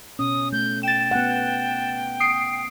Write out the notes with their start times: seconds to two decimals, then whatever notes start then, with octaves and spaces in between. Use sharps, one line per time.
0.19 B2 C#4 D#6
0.53 A3 G6
0.83 G5 A6 E7
1.11 B3 F#5
2.20 D#6 C7 D7